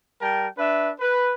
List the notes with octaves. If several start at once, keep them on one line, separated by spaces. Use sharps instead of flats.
G3 A#4 G5 A5
D4 B4 E5
B4